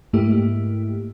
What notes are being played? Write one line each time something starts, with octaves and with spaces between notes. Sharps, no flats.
G#2 A3 A#3 E4 G4